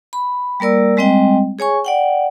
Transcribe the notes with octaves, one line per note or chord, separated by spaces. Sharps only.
B5
G3 A#3 A#4 D5 E6
G3 G#3 C4 D#5 G5
G#4 C#5 G#5 C#6
D5 F#5 G5